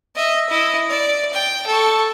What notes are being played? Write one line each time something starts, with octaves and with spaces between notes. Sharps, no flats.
D#5 E5
E4 D#5
D5
G5
A4 C#6